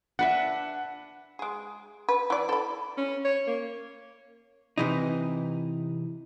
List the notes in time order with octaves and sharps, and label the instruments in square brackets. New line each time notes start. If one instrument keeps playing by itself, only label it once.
[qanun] D4 B4 E5 [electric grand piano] F#5
[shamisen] G#3 G#4
B4
E3 D5
A4 B5
[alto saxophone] C#4
C#5
A#3
[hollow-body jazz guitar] C3 E3 D#4